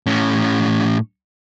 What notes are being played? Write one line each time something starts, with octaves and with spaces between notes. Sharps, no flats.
A2 C#4